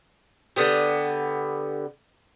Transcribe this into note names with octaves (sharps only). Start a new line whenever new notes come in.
D3 B3 G4